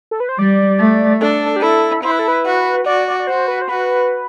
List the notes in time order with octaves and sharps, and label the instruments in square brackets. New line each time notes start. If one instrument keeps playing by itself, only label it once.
[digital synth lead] A4
B4
C5
[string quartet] G3 [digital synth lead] D5
[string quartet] A3
[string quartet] D4 [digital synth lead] A4
[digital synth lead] G4
[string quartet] E4 [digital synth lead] A4
[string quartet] E4 [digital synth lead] C5
[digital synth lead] B4
A4
B4
[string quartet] F#4
[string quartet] F#4 [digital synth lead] D5
[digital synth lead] D5
D5
[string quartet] F#4 [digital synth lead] C5
[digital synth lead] B4
C5
[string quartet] F#4 [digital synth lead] B4